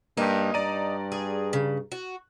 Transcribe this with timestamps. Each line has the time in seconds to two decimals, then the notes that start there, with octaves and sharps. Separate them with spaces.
0.17 G2 A#3 D#4
0.54 G2 D5 A#5 D#7
1.12 G#4
1.53 C#3
1.92 F#4